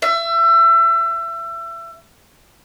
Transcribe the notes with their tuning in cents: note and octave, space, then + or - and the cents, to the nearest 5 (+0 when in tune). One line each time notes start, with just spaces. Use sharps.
E5 +30